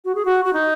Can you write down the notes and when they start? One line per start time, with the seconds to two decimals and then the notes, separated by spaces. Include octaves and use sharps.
0.05 F#4
0.15 G#4
0.25 F#4
0.45 F#4
0.53 D#4